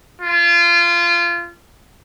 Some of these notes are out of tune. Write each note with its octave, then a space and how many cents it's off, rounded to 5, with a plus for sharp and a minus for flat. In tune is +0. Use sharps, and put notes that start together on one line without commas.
F4 -25